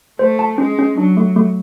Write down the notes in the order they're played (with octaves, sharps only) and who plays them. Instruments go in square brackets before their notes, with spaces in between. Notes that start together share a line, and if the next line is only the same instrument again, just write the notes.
[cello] A3 [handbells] C5
[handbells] A5
[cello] G#3 [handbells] C#4
[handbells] C#4
[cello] F#3 [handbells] D4
[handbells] A3
A3